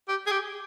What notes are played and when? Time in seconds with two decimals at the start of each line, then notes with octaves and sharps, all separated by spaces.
0.08 G4
0.26 G#4
0.31 G4